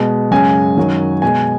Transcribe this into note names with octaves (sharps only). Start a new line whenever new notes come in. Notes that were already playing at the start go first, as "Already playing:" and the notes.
Already playing: B2 G#3
F#2 C#3 G#3 G#5
F#2 D#3 F#3
B2 G#3 G#5